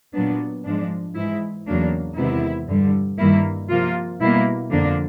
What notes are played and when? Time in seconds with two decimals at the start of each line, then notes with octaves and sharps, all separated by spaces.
0.15 A#2 F#3 B3 D4
0.65 G#2 F3 G#3 D4
1.16 G#2 E3 G#3 E4
1.67 E2 C#3 F#3 A#3 D4
2.17 E2 C3 D#3 G#3 B3 E4
2.68 G2 D3 G3
3.19 G2 D#3 G3 A#3 E4
3.70 C3 F3 A#3 F4
4.20 B2 G3 A#3 E4
4.71 F2 D3 F3 A#3 D4